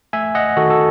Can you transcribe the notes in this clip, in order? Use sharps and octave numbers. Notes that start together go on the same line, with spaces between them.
A3 E5 G#5
D#5 F#5
D#3 F#4 A4
A4